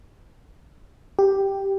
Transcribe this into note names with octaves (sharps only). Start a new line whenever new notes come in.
G4